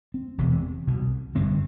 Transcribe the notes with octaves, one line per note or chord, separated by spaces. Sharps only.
C4
E1 E2 C3
C2 B2
G1 G2 D3 C4